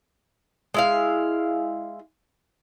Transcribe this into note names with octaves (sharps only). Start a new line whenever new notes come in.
G#3 E4 F5